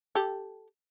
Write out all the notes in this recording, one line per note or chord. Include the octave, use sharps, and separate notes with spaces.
G4 A4